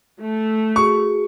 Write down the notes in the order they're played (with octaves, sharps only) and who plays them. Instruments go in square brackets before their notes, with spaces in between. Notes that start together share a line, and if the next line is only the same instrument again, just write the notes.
[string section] A3
[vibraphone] F#4 G#4 [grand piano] C#6